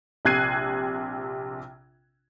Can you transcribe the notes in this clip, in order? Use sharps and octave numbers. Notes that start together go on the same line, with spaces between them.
A#1 C3 F#6 G#6 C7 D#7